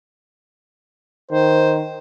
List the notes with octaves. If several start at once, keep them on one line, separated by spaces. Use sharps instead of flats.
D#3 C5